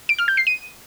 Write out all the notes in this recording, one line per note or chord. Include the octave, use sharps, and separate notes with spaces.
D7
F6
G6
C7
D#7